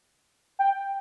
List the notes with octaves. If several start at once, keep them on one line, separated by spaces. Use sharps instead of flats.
G5